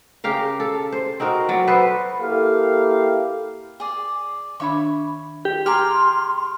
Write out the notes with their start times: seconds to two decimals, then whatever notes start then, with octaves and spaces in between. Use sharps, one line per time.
0.24 C#3 G4 A#4 F5
0.60 A4
0.92 C5
1.20 C4 D#4 F#4 A#4
1.49 F#3 D5
1.67 B3 A4 B4 C5
2.19 A#3 E4 G4 A4 A#4 F5
3.80 G#4 D5
4.60 D#3 D4 C#5 E5 B5 C#6
5.45 G4
5.66 G4 G#4 A#5 C6 F6